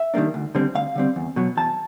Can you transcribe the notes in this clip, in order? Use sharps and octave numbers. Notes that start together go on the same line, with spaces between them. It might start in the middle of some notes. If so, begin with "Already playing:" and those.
Already playing: E5
D#3 G3 A#3 D4
D2
D3 G3 C4
D2 F5
D3 G3 C4
E2
B2 F#3
E2 A5